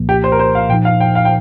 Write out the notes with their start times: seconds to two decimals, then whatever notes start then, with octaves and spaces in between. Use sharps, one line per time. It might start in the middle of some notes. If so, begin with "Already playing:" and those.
Already playing: C2 A#2 F3 A#3
0.09 G4
0.24 C5
0.32 A#4
0.39 C5
0.55 F5
0.69 A#2 F3 D#4 G5
0.85 F5
1.00 G5
1.15 F5
1.25 G5